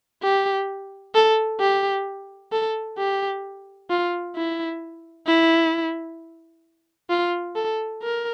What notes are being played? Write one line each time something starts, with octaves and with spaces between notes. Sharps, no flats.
G4
A4
G4
A4
G4
F4
E4
E4
F4
A4
A#4